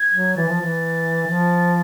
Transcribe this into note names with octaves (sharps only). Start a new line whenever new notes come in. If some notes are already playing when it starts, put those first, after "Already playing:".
Already playing: G#6
F#3
E3 A6
F3
E3
F3